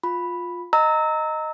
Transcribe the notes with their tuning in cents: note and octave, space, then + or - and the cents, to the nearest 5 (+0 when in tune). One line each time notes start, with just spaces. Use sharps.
F4 +15 B5 +0
D#5 +0 A#5 -20 E6 -25